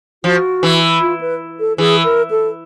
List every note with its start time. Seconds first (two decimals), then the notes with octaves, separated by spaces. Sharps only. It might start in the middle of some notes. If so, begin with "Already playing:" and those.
0.24 F3 F#4
0.63 E3
1.01 F4
1.21 B4
1.60 A4
1.78 E3 G#4
2.04 A#4
2.30 A4